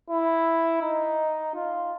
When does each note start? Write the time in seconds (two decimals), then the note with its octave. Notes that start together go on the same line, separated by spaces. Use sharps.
0.10 E4
0.82 D#4
1.55 F4